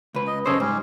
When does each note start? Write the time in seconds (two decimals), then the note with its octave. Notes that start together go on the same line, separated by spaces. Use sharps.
0.15 C#2 B4
0.27 D#5
0.46 F#2 C#3 A4 C5 C#5 D#5
0.60 G#2 G3 C#4